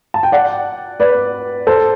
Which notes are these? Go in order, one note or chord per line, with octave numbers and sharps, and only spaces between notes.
A5
G5
D5 F#5
B4 D5
A4 C5